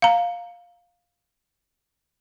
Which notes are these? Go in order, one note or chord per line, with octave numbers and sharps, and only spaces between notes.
F5 A#5